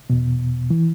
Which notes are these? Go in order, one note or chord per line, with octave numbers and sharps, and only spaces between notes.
E2 B2
E3